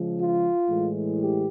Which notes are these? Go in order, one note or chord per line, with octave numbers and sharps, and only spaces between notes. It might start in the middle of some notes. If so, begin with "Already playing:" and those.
Already playing: C#3 F3 G#3
F4
A2 E3 G#3
G4